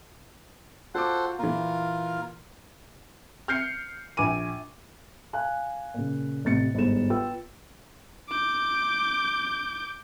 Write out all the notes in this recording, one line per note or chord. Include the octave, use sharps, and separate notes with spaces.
F4 F#4 A4 C5 F#5 D6
A#2 E3 F4 A#4
F6 G6 C7 C#7
A#1 G#5 D6 D#7
F5 G#5 F#6
A#2 C#3
A1 C3 A6 C#7
G1 G#2 C5 E7
F4 B4 G5 E6
D6 G6